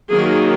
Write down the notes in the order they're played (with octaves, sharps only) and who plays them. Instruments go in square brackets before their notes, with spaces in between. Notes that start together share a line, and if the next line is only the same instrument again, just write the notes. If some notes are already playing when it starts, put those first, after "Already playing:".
[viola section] D#3 F#3 A#3 G#4